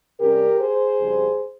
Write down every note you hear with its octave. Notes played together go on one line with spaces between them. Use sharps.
C3 G3 C#4 G4 A#4
G#4 C5
F2 C#3 G3